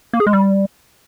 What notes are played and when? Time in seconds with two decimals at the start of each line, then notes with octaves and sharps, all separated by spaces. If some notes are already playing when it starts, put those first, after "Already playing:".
0.13 A#3
0.20 G#4
0.27 G#3
0.33 G3